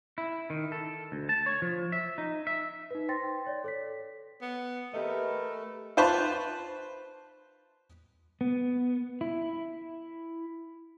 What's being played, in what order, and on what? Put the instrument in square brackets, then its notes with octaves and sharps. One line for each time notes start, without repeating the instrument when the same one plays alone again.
[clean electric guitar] E4
D#3
A4
D2
A5
C#5
F3
E5
D#4
E5
[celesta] D#4 B4
C5 G5 C6 A6 A#6
C#5 D5
A4 C#5 B6
[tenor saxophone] B3
[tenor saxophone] A3 [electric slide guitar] G4 D#5 [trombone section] A#4 B4
[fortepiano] F4 B4 C5 A5 B5 C#6
[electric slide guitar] B3
E4